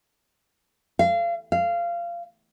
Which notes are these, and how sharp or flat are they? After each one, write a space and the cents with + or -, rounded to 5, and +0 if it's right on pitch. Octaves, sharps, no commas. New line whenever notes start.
F5 -30
F5 -20